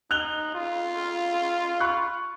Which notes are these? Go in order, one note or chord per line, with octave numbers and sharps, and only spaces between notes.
D#4 F#6 F7 G7
F4
B5 C#6 F#6